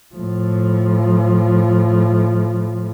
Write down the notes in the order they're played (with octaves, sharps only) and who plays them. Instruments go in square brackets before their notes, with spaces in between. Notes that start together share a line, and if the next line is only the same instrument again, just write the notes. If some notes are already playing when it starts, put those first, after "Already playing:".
[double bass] A2 F3